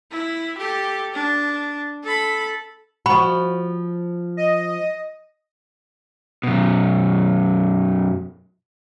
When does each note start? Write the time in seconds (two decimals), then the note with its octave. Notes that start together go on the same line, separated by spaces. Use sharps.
0.11 E4
0.58 G4 A4
1.14 D4
2.04 A4 B5
3.06 F3 F#4 B5
4.37 D#5
6.43 F#2 B2